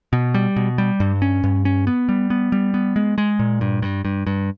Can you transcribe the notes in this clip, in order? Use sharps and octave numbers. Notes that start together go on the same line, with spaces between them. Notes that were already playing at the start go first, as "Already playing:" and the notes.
B2
G3
B2
G3
G2
C#4
G2
C#4
B3
G3
B3
G3
B3
G#3
G#3
A#2
G2
G2
G2
G2